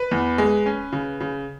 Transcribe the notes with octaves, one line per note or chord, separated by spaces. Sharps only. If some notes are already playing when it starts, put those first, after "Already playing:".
Already playing: B4
E2
G#3
C#4
C#3
C#3